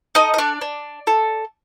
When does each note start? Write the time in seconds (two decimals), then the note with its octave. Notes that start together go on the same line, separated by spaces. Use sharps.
0.15 D#4 A4 D#5
0.34 D#5
0.38 D4 D5
0.61 D4
1.07 A4